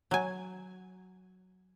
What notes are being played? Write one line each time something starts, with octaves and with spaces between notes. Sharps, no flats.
F#3 G#5